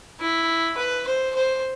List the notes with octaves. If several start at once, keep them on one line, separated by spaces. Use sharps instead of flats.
E4
B4
C5
C5